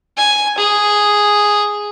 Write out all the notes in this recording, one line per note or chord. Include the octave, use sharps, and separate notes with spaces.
G#5
G#4